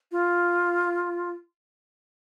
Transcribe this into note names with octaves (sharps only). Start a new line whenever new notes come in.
F4